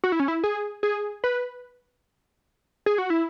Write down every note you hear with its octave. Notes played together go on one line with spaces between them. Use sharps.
F#4
E4
C#4
E4
G#4
G#4
B4
G#4
F#4
E4